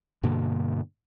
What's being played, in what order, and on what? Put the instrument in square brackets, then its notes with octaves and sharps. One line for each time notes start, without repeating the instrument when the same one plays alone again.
[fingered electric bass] G2 B2 D3 A#3